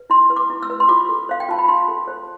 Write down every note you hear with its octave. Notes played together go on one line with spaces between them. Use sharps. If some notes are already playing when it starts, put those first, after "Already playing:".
Already playing: B4
E4 C6
B4
D6
E4
E6
B4
C6
F4 D6
A4
C5 F5
G5
F4 A5
B5
F4 C6
A4
C5